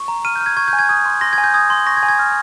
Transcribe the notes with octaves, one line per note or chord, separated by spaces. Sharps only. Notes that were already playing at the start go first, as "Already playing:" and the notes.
Already playing: C#6
A#5
F6 D#7
G6
F6
G#6
C#6 G#6
G6
G#5
G#6
D#6 G#6
C6
C6 A#6
G#6
G#5
G6
D#6 G#6
C6
C#6 A#6
G#6
G#5
G#6
F6